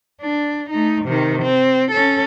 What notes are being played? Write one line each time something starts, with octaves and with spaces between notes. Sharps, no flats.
D4
A3 D#4
C3 D#3
C4
C#4 A4